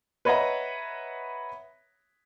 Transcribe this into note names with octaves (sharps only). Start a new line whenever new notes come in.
B4 C#5 D#5 E5 F#5 A#5